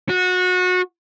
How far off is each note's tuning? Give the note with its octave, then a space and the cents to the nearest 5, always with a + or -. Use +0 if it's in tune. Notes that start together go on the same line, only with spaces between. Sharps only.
F#4 -25